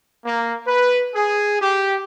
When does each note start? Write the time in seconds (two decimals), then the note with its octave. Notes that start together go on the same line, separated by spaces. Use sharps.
0.25 A#3
0.67 B4
1.15 G#4
1.62 G4